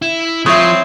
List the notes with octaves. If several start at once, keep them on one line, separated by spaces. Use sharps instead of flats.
E4
F3 C4 E4 C#5 D#6